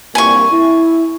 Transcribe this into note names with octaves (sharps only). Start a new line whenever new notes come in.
C2 G2 A#2 G#5 C#6
E4